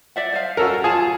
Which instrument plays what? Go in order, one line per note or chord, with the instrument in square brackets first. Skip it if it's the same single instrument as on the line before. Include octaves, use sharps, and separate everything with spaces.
[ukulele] D5 E5 F#5
C5 D#5 F5
[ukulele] C#4 [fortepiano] F#4 A4 A#4
[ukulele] F4 A5 [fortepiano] G#4